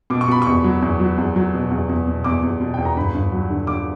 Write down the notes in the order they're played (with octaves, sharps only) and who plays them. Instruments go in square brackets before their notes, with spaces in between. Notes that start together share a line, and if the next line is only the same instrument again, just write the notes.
[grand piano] B2 D6
C#6
B2 B5
E2 C#6
F#3
E2
F#3
E2
F#3
B2
E2
E2
B2
E2 D6
E2
B2
E2 G5
A#5
G1 B5
G1
F#3
D3
D3 D6